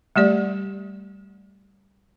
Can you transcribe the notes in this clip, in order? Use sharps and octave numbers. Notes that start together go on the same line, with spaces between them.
G3 A3 G4 D5